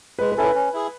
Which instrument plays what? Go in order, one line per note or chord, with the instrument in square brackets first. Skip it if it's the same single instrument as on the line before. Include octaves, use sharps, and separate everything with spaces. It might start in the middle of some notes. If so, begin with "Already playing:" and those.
[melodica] G#3 [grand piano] B4
[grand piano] B4
[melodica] C#4 E4 [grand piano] A4
[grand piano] B4
[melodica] C#4
E4 G#4